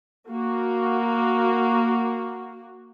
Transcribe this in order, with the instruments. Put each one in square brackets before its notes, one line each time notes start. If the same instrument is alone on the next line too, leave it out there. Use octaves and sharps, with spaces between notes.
[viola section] A#3 F#4